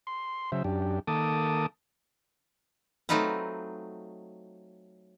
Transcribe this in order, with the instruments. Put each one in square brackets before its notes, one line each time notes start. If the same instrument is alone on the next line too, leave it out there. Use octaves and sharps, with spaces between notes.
[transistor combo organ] C6
C#3 F#3 C5 E5
F#2 D4 G4
D#3 A#3 A4 A5 D6 D#6
[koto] F#3 A3 C4 D#4 F4 B4